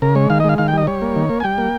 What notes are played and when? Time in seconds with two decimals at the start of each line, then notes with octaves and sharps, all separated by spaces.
0.02 C#3 A#4
0.15 G#3 C#5
0.30 D#3 F5
0.40 D#5
0.44 G#3 F5
0.58 D#3 F5
0.68 G5
0.73 G3 D#5
0.87 G3 C#5
1.02 A#3
1.16 D#3
1.29 A#3
1.40 G#5
1.44 G3 G5
1.58 A#3